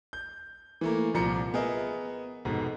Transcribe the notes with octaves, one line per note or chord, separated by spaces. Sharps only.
G6
E3 A3 A#3
C2 A#2 F3 A#5 C#7
B3 G#4 A#4 D#5 E5
F1 G#2 B2